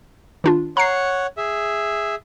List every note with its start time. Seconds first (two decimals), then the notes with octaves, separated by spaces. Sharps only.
0.44 D#3 D4 F4
0.77 C#5 F#5 A#5 C7
1.37 G#4 E5